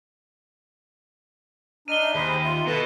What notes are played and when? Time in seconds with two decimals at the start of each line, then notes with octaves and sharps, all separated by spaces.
1.88 D4 D#4 F6 D#7 G7
2.02 E5
2.15 D#2 G#4 C5 B5
2.43 F4 E5
2.67 B2 A4 B4 A5